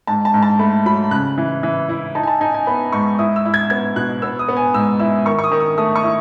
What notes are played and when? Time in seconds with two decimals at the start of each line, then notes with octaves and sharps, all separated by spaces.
0.07 G#2 A5
0.25 A5
0.34 G#2
0.43 A5
0.59 A3 B5
0.86 F#3 B5
1.11 C#3 F#6
1.38 E3
1.63 E3
1.89 E4
2.15 D#4 A5
2.23 G#5
2.27 A5
2.41 D#4 G#5
2.54 G#5
2.67 B3 B5
2.93 G#2 C#6
3.19 E4 D#6
3.36 E6
3.45 E4
3.54 G#6
3.70 B3 G#6
3.96 B2 F#6
4.22 B3 E6
4.39 D#6
4.49 B3
4.57 G#5
4.74 G#2 E6
4.99 E4 E6
5.26 D#3 C#6
5.39 C#6
5.44 D#6
5.52 D#3
5.60 D#6
5.78 A3 D#6
5.96 C#6
6.04 E4